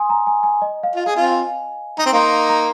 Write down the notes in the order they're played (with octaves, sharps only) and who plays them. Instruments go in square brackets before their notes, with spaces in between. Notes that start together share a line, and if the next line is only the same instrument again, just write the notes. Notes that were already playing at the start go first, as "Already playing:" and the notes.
Already playing: [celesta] G#5 C6 D#6
A#5
G#5
G#5
D#5
F5
[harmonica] F4
[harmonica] G#4 [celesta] G#5
[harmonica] C4 F4
[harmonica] D#4 [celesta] A#5
[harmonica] C4
[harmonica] A#3 D#4 [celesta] C6
[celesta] A#5
A#5